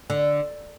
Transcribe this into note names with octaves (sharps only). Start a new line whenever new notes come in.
D3